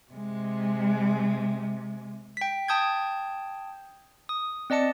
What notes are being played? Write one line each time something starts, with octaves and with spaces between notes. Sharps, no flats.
C3 G#3
G5 B6
G5 A5 D#6 G6 G#6
D#6
C4 D5 D#5 A5 C#7